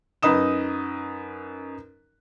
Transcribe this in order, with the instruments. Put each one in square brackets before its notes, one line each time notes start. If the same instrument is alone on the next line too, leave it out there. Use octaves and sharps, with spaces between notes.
[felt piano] F#2 D#4 B4 D#5 D#6 E7